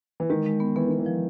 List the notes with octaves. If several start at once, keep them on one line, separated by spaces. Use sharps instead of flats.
E3
D#3 G#3
G#3
B3
E3 B3
D#3 B3
E3
F3